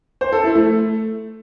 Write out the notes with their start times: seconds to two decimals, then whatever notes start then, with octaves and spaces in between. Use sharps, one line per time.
0.21 C5
0.33 A4
0.44 E4
0.55 A3